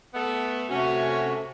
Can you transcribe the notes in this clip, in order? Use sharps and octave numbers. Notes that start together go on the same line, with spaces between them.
A3 B3
C3 A3 C#4 F#4